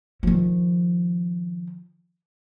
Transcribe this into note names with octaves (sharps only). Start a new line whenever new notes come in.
D#3 F3